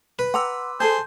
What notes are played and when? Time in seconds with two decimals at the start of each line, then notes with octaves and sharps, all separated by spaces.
0.19 B4
0.34 F#5 A#5 C6 D6 E6
0.80 G#4 A4 C5 A5 G6